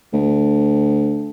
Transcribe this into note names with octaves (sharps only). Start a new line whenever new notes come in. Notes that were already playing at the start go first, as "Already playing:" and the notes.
D2